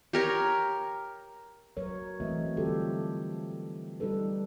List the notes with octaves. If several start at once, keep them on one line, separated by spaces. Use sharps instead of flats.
G4 A#4 C#5
F#3 A#4 B4 C#5
E3 A3 C4 F#4 D#5 E5
D3 G3 C4 F4 G4 A4
G3 D#4 G4 A4 B4